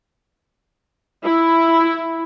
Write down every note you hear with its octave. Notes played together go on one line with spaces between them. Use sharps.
E4